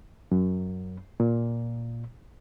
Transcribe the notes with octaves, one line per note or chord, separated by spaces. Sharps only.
F#2
A#2